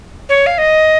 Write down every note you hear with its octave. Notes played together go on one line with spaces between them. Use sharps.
C#5
F5
D#5